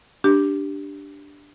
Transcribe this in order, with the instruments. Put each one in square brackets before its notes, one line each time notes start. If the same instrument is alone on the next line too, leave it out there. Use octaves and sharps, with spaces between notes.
[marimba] D4 G4